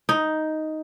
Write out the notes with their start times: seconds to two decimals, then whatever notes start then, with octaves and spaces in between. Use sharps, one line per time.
0.09 D#4